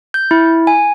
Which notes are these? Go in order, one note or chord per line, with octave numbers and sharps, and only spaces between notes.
G6
E4
G#5